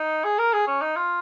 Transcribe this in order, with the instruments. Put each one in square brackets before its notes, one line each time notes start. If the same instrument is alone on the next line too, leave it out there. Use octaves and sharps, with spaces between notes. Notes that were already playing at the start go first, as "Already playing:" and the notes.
Already playing: [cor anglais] D#4
G#4
A#4
G#4
C#4
D#4
F4